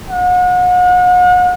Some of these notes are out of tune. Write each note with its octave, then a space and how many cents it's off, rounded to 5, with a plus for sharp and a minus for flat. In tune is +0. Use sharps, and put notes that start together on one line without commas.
F#5 -40